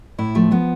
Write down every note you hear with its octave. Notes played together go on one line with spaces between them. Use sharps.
A2 E4
F3 A3
F3 B3